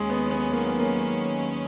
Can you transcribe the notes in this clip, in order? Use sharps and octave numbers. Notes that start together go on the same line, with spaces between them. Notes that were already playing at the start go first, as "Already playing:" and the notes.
Already playing: D#2 D#3 F#3 G#3 C#4
B3
B3
A#3
B3
A#3